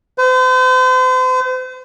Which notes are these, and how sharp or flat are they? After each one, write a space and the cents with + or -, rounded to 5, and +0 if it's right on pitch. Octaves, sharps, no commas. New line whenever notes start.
C5 -40